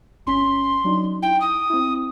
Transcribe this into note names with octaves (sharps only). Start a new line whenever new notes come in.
G1 C#4 C6 B6
F#3 D4 D#4
E4 G5
D#6
C4 E4